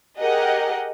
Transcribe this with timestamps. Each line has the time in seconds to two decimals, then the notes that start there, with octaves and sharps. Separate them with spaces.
0.19 G4 G#4 A#4 D#5 F#5